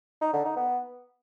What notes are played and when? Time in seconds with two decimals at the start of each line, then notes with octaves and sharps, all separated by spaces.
0.21 D#4
0.33 D3
0.45 D#4
0.56 B3